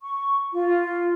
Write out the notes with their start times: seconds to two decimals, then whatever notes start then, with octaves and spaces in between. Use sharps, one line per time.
0.01 C#6
0.53 F4